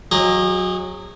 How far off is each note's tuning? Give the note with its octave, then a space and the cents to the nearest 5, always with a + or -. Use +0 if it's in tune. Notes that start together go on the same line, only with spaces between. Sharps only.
F#3 -15 G#4 -40 D#5 +5